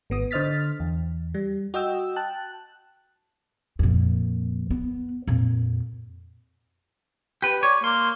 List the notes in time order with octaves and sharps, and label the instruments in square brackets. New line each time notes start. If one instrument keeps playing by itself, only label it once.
[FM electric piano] G#1 B3 D#6
D3 C5 D#5 F6 A6 B6
E2
G3
F#4 D#5 G5 E6
G5 A5 F#6
[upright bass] F2 A#2
B3
F2 A#2
[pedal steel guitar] G4 B4
[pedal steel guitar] C#5 [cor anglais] D5
[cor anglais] A#3 [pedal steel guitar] C6